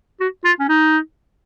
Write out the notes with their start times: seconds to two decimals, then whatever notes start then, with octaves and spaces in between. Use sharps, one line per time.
0.20 F#4
0.45 F4
0.60 C#4
0.69 D#4